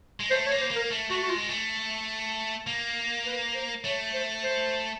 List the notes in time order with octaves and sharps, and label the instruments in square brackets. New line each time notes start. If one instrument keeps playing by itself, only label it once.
[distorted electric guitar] G#3
[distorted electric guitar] A3 [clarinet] C5
[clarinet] C#5
[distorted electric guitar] A#3
[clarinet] C5
[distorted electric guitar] A#3
[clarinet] A#4
[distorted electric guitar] A3
[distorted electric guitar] A3 [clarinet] F#4
[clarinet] F#4
[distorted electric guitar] G#3 [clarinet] F4
[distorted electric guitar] A3
A#3
[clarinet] B4
C5
[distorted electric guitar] A3 [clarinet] C#5
[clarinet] C5
C5